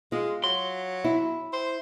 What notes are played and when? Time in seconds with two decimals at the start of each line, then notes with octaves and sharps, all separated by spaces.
0.12 G#3 F4
0.44 F#3 C6
1.04 E4
1.53 C5